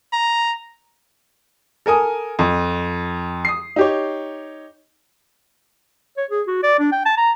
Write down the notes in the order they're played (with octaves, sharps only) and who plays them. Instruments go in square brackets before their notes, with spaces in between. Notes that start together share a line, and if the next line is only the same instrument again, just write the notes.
[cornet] A#5
[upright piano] A4 A#4 G#5 D#6
F2
D#6 C7
D#4 G4 C#5
[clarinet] C#5
G#4
F#4
D5
D4
G5
A5
A#5